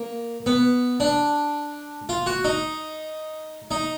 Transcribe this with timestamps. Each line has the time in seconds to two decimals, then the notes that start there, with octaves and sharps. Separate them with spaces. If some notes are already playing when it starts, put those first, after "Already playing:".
Already playing: A#3
0.46 B3
1.00 D4
2.09 F4
2.26 F#4
2.44 D#4
3.71 D#4